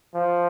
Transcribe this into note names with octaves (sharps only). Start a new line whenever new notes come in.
F3